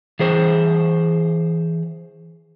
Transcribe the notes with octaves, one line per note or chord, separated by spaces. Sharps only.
E3 G#4 C5